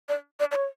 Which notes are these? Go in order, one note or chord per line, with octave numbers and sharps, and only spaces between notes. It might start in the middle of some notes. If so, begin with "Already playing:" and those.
D5
D5
D5
C#5